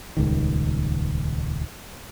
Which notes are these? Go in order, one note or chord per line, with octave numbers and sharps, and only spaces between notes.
D#1 C#2 D#3